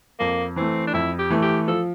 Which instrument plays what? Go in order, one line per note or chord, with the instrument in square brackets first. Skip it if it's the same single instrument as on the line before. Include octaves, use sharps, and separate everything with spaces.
[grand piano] F2 [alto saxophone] A#3
[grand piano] E3 A3 [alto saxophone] C4
[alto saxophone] D4
[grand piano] F2 [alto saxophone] E4
[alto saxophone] G4
[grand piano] E3 A3
[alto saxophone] G4
[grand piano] F3 [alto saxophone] A4